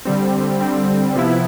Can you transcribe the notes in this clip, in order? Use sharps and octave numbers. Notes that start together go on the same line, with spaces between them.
D3 G3 C4
D3 G3 C4
C3 F3 B3 E4